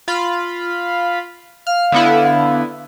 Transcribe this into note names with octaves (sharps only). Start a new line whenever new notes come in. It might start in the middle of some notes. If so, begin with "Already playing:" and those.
F4 F5 B5
F5 F6
D3 B3 E4